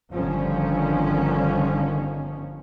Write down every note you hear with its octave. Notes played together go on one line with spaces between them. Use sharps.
G1 D3 D#3 F3 C#4